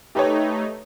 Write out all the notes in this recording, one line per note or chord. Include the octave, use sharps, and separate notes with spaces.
A3 D#4 G4 B4 C#5